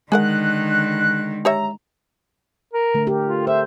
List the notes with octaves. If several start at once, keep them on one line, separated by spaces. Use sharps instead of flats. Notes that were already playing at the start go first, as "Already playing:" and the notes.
D3 D#3 G#3 G#4 A#4 F#5 F#6
G4 C#5 E5 A#5
A#4
D3 A3
G4 A#4
F4
C5 E5